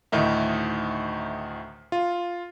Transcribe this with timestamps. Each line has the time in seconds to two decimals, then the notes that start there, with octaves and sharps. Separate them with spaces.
0.12 D2 A2 D#3 D#4 E5
1.92 F4